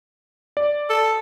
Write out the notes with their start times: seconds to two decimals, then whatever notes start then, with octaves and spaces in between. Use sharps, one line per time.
0.57 D5
0.90 A4